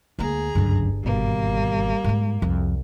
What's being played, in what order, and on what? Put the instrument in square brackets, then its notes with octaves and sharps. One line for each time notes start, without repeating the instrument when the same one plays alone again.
[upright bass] D2 A#3 [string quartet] G#4 A#5
[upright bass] G1 D4 [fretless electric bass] C#2 F#2 D3
[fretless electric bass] G#1 B2 [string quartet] G3 A#3
[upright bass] G#2 B3
[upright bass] C2 [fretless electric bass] F2